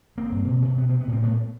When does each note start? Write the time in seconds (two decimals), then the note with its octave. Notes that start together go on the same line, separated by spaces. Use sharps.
0.17 A1 A#3 C4
0.32 G2
0.48 B2
0.62 B2
0.78 C3 B3
0.90 C3 C4
1.01 B3
1.07 A2
1.12 C4
1.22 A2 A3 B3